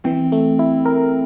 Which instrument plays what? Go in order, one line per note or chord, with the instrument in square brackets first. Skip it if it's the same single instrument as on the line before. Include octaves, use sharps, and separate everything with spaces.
[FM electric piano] E3 [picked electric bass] C4
[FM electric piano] A3
E4
A#4